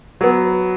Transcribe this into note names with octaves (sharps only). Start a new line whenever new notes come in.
F#3 B3